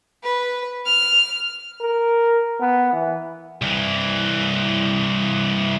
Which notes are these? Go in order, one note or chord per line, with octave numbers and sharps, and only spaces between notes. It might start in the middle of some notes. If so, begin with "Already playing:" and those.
B4
F6
A#4
B3
E3
C2 E3